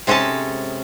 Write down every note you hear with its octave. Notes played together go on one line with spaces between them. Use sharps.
C3 G#3 C#4 A4 A5